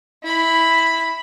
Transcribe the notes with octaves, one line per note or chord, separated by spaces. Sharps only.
E4 B5